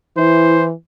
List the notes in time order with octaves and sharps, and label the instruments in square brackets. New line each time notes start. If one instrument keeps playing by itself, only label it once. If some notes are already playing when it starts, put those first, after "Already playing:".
[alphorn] E3 [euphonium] E4 [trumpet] C5